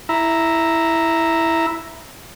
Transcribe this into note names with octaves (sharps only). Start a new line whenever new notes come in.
E4 A#5